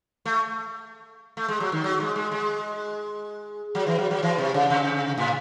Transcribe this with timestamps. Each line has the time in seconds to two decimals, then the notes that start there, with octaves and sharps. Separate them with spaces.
0.25 A3
1.37 A3
1.48 G#3
1.60 F#3
1.72 D#3
1.84 F#3
2.00 G#3
2.16 G#3
2.32 G#3
3.75 F#3
3.87 E3
3.98 F#3
4.11 F#3
4.23 E3
4.38 C3
4.54 C#3
4.70 C3
5.18 A2